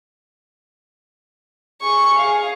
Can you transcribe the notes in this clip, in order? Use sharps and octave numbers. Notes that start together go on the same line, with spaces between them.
G#4 C#6
G#4 F5